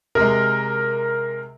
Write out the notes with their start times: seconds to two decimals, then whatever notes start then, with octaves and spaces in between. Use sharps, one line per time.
0.15 C3 G#3 A#4